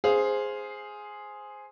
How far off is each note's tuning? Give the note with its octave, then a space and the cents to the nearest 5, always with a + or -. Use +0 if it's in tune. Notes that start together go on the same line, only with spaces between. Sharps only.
G#4 +0 C5 +0 F5 +0